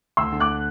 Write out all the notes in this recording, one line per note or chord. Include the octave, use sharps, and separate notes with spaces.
D2 C6 E6
D3
D6 F#6